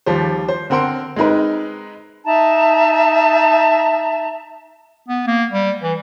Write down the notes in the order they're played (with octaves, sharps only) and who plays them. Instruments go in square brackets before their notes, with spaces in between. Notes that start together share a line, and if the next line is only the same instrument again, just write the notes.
[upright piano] D#2 F3 G3 C5
C5
D3 C4 A#4 F#5 C6 D7
G#3 C4 D#4 A#4 B4
[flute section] D#4 E5 A5 A#5
[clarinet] B3
A#3
G3
E3